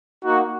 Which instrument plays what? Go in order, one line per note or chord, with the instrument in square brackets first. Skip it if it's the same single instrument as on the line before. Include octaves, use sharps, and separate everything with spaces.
[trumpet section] A#3 D#4 F#4